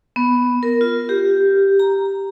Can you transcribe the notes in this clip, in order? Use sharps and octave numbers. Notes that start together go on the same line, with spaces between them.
B3
A#4
F4
G4
A#5